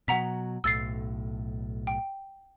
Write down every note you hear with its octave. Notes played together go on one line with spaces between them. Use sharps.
B2 F#3 F#5 A#5 B6
B1 A2 E6 A6 C7
G5